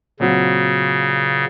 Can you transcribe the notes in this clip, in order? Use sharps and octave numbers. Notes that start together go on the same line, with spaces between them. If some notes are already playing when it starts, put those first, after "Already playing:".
A#2 C#3 F#3 C4 F#4